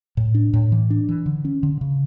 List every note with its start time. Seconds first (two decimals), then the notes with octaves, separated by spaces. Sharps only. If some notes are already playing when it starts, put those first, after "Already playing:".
0.17 A2
0.35 D4
0.53 A2
0.72 E3
0.90 D4
1.09 E3
1.26 D3
1.45 C#4
1.63 D3
1.81 C#3